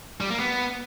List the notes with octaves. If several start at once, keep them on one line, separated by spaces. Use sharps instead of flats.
G3
A#3
B3